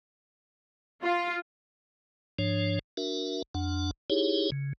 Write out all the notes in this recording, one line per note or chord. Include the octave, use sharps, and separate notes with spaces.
F4
G#2 F3 D4 C#5
D4 F#4 A#4 E5
F2 D4 F#5
D#4 E4 G4 G#4 C#5
C#3